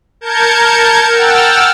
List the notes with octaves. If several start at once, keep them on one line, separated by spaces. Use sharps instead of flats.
A#4 A5 G6 G#6 C#7
F#5 G5 E6 F6 A6